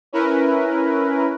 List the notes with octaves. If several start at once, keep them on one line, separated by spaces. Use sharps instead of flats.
C#4 E4 A#4 B4